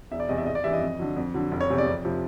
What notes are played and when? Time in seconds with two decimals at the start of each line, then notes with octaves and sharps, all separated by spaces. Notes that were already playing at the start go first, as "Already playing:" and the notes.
0.11 E1 E5
0.20 D5
0.29 E2 C3 D#5
0.38 E5
0.46 G#1 D#5
0.55 D5
0.64 G2 E3 G3 E5
0.73 D#5
0.81 F2
0.99 D3 F#3
1.17 F2
1.34 D3 F#3
1.51 F1
1.61 C#5
1.69 E2 C3
1.78 D5
1.87 F2
2.05 C3 F3